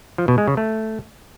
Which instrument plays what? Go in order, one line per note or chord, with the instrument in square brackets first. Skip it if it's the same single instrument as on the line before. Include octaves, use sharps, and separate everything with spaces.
[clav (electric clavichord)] F3
B2
G#3
C#3
A3